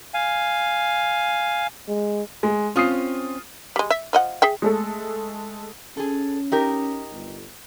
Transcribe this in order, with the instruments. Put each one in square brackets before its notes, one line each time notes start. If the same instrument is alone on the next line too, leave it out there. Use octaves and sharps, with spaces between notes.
[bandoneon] F5 G#5
[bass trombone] G#3
[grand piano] G#3
[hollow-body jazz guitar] C4 C#4 [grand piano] F4 D#6 C7
[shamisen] G3 G#3
E5
F3 D#5 F#5
G#4 E5 G5
[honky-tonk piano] G#3 A3 A4
[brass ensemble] C#4 [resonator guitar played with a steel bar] G#4 A4
[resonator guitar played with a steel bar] D#4 G4 A#4
[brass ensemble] G1